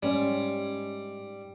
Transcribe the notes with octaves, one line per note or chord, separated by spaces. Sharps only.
G#2 G3 C#4